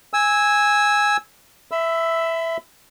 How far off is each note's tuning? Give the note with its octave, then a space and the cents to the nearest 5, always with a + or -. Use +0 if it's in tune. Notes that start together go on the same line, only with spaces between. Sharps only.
G#5 -5 E6 -15
E5 +0 B5 +35 E6 +0